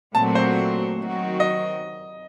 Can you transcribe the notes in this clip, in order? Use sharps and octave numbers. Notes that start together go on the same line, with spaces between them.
A#2 F#3 A3 C4 F#4 A5
C5
D#3 F#3 C4 F#4
D#5